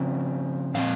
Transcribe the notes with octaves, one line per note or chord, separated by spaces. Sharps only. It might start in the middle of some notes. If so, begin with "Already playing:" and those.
Already playing: C#3 F3 C4
A#2 F3 C4 F5